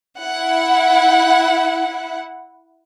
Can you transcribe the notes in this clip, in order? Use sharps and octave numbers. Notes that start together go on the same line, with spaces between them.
E4 F#5